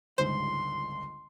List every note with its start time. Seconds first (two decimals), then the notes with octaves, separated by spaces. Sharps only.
0.18 G1 C#2 G#2 C5 C6